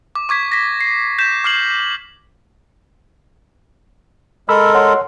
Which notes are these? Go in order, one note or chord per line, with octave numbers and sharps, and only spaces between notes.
D6
C#6 D6 G#6 B6
A#6 B6
C7
G6 B6 E7
D6 F6 C7 F#7
G#3 A4 A#4 B5 E6
C#5 F#5 C6